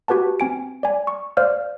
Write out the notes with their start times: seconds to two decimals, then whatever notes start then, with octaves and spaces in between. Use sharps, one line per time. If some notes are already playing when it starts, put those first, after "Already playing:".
0.08 F#4 G4 B4 F#5 A5
0.40 C4 G#5 D7
0.83 D5 G#5
1.07 C#6
1.37 C5 D5 F5 F6